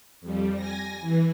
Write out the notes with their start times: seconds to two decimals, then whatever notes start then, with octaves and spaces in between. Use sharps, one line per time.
0.21 F2 G3
0.55 G#5 A#6
1.01 E3